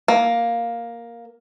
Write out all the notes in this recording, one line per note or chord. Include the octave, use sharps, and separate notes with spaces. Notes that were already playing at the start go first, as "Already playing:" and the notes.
A#3